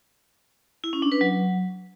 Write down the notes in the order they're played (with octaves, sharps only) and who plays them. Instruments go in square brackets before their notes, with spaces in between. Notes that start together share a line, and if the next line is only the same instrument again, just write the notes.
[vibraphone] E4
C#4
D4
B4
F#3